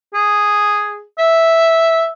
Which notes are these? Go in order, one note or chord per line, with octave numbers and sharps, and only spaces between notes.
G#4
E5